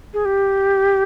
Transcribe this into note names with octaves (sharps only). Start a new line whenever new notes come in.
G#4
G4